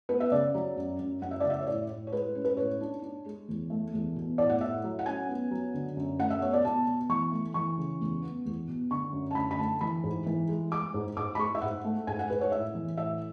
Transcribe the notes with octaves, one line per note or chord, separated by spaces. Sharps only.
B3 B4
E5
C#3 D5
F#3
F#2
F#2
F#2 F#5
E5
C#3 D5
E5
C#5
A2 D5
A2
C#5
G#3 B4
C#4
B4
A2 C#5
D4
D4
G#3
E2
A3
E2
B2
A2 D5
F#5
A2 E5
F#3
F#5
C#4 G#5
B3
F#3
D3
F#2
A3 F#5
E5
B2 C#5
D5
B2 A5
B2
E3 C#6
A3
E3 C#6
C#3
E2
B3
E2
B2
D3 C#6
F#2
A5
D3 B5
B5
A3 A5
E3 B5
G#2
E3
G#3
G#3 D6
G#2
G#2 D6
B5
G#3 C#6
E5
G#2 F#5
A3
G#2 G#5
F#5
G#2 B4
C#5
A2 E5
E3
A2 E5